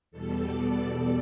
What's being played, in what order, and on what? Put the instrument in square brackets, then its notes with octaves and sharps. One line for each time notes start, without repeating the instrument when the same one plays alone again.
[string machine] E2 B2 G3 A4
D5
D5